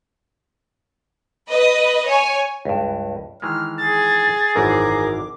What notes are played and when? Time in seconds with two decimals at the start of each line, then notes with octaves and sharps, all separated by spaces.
1.48 B4 D#5
2.05 C#5 G#5
2.65 C#2 G2
3.42 D#3 E3 G#3 F6
3.78 G#4 A6
4.55 G#1 F#2 E3 A#4 D6